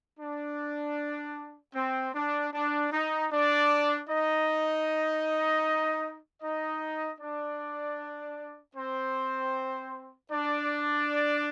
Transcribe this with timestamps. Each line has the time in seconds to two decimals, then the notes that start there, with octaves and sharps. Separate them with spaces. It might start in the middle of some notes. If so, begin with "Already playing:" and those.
0.20 D4
1.75 C4
2.15 D4
2.53 D4
2.92 D#4
3.31 D4 D5
4.09 D#4 D#5
6.43 D#4 D#5
7.20 D4 D5
8.76 C4 C5
10.32 D4 D5